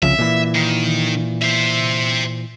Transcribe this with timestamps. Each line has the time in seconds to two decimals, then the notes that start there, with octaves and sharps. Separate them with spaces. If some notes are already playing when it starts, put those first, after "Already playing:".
0.03 C2 C#3 F3 E5
0.19 A#2 E3
0.55 D#3
1.42 C5 E5